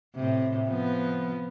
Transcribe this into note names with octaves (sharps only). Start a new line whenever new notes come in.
A2 C3
F3 B3